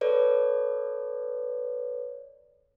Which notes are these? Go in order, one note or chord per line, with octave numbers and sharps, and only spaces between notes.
A4 B4 C#5 D5